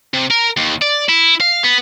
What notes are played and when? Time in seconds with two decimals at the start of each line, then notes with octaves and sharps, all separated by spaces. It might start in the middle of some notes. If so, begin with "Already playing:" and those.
0.14 C3
0.30 A#4
0.57 D#2
0.82 D5
1.09 E4
1.40 F5
1.64 B3